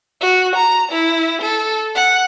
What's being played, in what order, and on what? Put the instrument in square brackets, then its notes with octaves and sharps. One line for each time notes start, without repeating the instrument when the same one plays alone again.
[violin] F#4
A#5
E4
A4
F#5